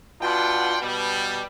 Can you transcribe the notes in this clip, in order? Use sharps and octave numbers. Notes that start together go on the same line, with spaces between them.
B2 D4 F4 F#5 G5 C6
B2 G3